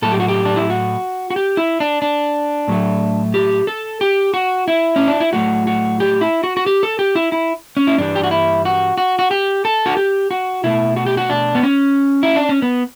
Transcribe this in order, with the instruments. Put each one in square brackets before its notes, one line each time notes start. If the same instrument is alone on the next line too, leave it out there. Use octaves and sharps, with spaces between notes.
[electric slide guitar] A2 F#3 A3 A4
G4
F#4
G4
D4
E4
F#4
F#4
G4
E4
D4
D4
A2 F#3 A3
G4
A4
G4
F#4
E4
C#4
D4
E4
A2 F#3 A3 F#4
F#4
G4
E4
F#4
F#4
G4
A4
G4
E4
E4
C#4
E4
G2 E3 G3 D4
G4
F#4
E4
F#4
F#4
F#4
G4
A4
F#4
G4
F#4
B2 A3 E4
F#4
G4
F#4
D4
B3
C#4
E4
D4
C#4
B3